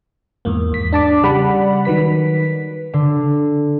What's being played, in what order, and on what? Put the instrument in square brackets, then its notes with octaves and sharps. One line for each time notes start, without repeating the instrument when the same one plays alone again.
[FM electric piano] E2 G#2 A#3
E2 B6
D4 A5 D6
C#3 G3 D5 F#5 B5
D#3 F#3 B4 B6
[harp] D3